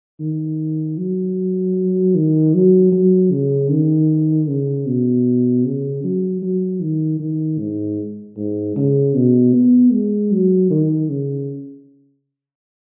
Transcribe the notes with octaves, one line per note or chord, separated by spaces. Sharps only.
D#3
F#3
D#3
F#3
F#3
C#3
D#3
C#3
B2
C#3
F#3
F#3
D#3
D#3
G#2
G#2
C#3
B2
B3
G#3
F#3
D#3
C#3